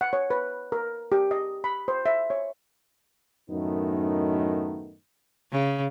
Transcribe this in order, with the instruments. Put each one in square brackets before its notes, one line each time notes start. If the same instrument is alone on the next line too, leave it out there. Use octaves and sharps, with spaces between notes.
[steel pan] F#5
C#5
B4
A#4
G4
D#5
B5
C5
E5
C#5
[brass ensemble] F#2 A2 D#3 A3 B3 D#4
[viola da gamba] C#3